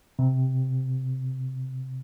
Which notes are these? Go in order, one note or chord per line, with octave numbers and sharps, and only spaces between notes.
C3